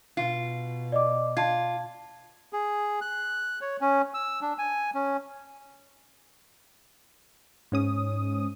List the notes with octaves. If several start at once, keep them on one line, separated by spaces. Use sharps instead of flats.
B2 F4
D5 D#5 D6
F4 A5 G#6
G#4
F#6
C#5
C#4
E6
D4
G#5
C#4
G#2 C#4 D#6